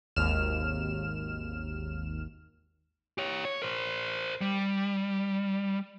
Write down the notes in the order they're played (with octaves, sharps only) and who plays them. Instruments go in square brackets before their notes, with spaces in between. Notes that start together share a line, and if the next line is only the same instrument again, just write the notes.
[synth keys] G#1 D#2 F6 E7
[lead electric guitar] G4 C#5
C#5
A#4 C5
G3